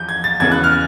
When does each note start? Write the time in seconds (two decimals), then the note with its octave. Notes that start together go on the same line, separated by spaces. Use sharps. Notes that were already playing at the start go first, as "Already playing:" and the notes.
Already playing: E2 F3 G6
0.09 G#6
0.24 A6
0.40 E2 C#3 E3 G#6
0.52 F#6
0.64 F6